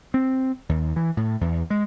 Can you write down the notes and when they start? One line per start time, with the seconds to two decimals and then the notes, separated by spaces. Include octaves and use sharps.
0.14 C4
0.69 D#2
0.96 E3
1.17 A2
1.41 E2
1.70 G#3